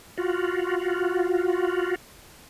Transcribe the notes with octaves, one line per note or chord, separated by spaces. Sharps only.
F4 F#4